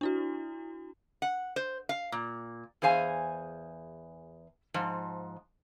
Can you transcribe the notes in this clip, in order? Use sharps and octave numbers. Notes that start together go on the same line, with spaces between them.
D4 E4 F#4
F#5
C5
F5
A#2
E2 G#4 C5 F5 G#5
G#2 F3